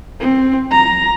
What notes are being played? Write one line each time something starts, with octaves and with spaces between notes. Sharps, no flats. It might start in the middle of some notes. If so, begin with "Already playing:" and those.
C4
A#5